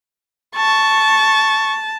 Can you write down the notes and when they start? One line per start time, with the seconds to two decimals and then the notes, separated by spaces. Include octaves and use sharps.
0.56 A5 C#6